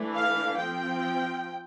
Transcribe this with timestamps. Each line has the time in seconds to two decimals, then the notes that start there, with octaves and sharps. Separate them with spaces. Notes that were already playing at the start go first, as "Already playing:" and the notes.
Already playing: E3 A3 D4
0.15 F5
0.59 F3 C4 G5